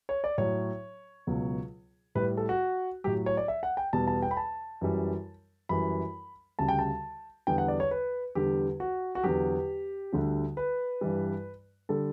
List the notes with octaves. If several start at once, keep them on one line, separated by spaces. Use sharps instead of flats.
C#5
D5
A2 F#3 C#5
C#2 B2 F#3
A2 G3 B4
A4
F#4
A2 F#3 G4
C#5
D5
E5
F#5
G5
E2 B2 G3 A5
A5
G5
B5
A5
F#2 E3 G3
F#2 E3 G3 B5
D2 C#3 G3 A5
G5
A5
E2 D3 G3 G5
F#5
D5
C#5
B4
E2 D3 G3 G4
F#4
F#4
E2 D3 F#3 G4
D2 D3 G3
B4
G2 E3 G3
D3 G3 A4